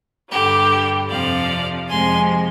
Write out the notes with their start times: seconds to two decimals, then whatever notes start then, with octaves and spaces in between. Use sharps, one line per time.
0.31 G2 D3 G3 G4
1.09 F2 C3 F3 D5 F5
1.89 F2 C3 F3 G#3 G#5 C6